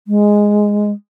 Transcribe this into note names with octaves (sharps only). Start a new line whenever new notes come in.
G#3